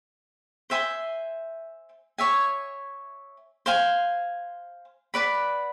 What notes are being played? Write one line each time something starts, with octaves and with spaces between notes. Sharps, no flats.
C5 E5 G#5 C6
C#5 E5 G#5
C5 F5 G#5
B4 D5 F#5 B5